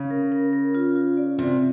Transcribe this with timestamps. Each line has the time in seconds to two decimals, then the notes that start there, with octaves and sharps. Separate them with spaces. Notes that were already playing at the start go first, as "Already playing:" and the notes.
Already playing: C#3
0.11 A#4
0.32 A#4
0.53 A#4
0.75 F4
0.96 F4
1.17 D5
1.38 C3 F4